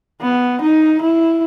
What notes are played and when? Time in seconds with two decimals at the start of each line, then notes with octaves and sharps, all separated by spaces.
0.22 B3
0.62 D#4
1.02 E4